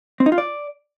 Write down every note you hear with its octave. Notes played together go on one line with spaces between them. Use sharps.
C4
D#4
F4
D5